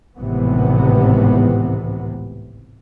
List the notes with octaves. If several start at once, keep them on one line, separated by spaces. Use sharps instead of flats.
G#1 C#2 A2 C3 E3 B3